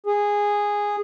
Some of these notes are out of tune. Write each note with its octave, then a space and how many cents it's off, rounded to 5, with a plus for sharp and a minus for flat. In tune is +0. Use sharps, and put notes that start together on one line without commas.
G#4 -10